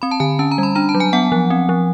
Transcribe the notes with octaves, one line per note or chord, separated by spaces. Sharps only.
C4 B5
A5
D3 G#5
C#4 A5
A#5
G3
B5
D4 A#5
A5
F#3
G#5
B3 F#5
F3
C4
F3